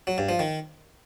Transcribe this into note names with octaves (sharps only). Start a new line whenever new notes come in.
F#3
G2
F3
D#3